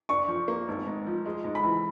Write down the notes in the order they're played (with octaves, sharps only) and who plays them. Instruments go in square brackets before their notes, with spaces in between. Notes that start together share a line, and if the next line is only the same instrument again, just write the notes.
[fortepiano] D4 [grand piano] C#6
[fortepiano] F3
A#3
G#1
G#2
F3
G#3
G#2
[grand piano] B5
[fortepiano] E3